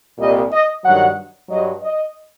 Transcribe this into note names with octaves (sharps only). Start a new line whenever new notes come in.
C2 A#2 G3 D#5
D#5
G2 D#3 F#3 F#5
G2 F#3 D#5
D#5